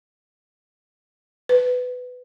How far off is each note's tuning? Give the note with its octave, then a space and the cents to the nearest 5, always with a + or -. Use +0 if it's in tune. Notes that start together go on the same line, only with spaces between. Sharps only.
B4 +15